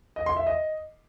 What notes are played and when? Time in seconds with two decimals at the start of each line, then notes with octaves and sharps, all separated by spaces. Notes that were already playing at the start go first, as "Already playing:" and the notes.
0.16 D#5
0.26 C6
0.36 E5
0.47 D#5